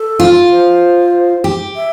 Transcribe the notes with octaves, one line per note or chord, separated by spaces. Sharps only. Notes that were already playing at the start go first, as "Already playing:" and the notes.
Already playing: A4
F4
C5
G4
E5